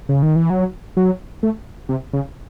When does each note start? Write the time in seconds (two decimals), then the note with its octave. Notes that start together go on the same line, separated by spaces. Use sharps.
0.09 C#3
0.22 D#3
0.36 E3
0.50 F#3
0.97 F#3
1.43 A3
1.89 C3
2.13 C#3